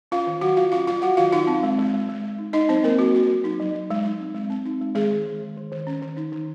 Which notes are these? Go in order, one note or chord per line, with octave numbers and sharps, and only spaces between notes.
C#4 F4 F5
D#3
F#3 F#4 F#5
F#3 F4 F5
C#4 F4 F5
F#3 F4 F5
F#3 F#4 F#5
D#3 F4 F5
D#4 F4 F5
C4
G#3
G#3
G#3
G#3
G#3
D#4
D#4 D#5
F#3 C4 C5
F#3 A#3 A#4
F#3 F#4
F#3 F#4
F#3
D#4
F#3
D#4
G#3
D#4
C4
G#3
C4
D#4
G#3
D#3 G#3 G#4
D#3
D#3
D#3
D#3
D#3
C#4
D#3
D#4
D#3